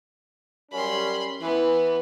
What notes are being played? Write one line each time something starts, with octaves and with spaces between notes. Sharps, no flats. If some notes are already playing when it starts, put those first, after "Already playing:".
F#2 G3 C#4 B5 C6
E3 B3 B4